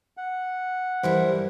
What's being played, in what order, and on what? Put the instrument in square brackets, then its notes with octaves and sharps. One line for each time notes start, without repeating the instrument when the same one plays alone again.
[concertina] F#5
[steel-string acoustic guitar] G2 E3 A#4 [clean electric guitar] G3 E4 [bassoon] C5